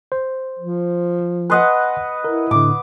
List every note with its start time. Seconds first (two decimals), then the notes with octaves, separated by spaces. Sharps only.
0.12 C5
0.59 F3
1.50 B4 D#5 F#5 G#5 C6 F#6
2.25 E4 A#4
2.51 A2 D3 D6